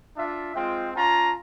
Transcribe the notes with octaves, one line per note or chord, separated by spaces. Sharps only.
D4 F4 E5
G#3 C4 F4 G5
C#4 F4 A5 A#5